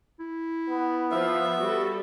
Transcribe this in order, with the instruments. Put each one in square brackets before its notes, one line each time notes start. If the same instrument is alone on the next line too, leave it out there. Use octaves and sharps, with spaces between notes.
[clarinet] E4
[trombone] B3
[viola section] F3 [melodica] E5
[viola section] G3 A4 [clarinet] F#4